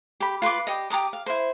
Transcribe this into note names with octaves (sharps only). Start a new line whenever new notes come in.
G4 B5
F4 B4 C6 D6
G4 D#5
G4 A#5 D6 D#6
F5
E4 C5